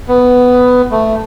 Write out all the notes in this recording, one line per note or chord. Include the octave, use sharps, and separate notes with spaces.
B3
A3